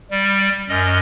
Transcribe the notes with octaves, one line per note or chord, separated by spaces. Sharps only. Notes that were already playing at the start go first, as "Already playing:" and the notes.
G3
F#2 D#5 F6